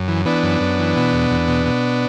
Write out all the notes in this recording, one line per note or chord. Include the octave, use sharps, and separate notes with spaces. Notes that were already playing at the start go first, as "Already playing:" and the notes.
Already playing: F#2
E3
E3 B3 D4
F#2
F#2
E3
B2
E2
E2
B2
B2